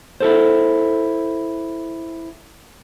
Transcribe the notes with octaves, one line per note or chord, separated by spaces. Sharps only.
E4 A4 C5